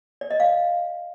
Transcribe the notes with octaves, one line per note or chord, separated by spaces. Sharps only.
D5
D#5
F5